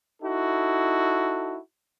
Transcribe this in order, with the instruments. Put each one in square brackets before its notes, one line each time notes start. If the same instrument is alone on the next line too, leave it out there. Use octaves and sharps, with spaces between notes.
[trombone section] D#4 E4 F#4 A4